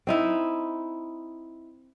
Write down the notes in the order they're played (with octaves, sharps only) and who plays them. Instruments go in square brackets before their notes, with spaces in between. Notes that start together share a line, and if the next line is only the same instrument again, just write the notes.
[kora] C4 D#4 E4